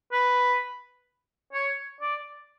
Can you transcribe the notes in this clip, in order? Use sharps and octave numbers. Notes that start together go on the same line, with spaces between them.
B4
C#5
D5